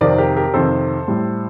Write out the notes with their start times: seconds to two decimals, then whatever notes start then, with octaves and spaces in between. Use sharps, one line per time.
0.01 F2 C3 D#3 A#4 D5
0.18 G4 A#4
0.36 G4 A#4
0.54 F2 C3 D#3 A4 C5
1.08 A2 G3